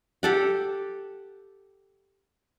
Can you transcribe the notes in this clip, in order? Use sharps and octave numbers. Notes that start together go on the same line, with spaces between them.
G4 A4 F#5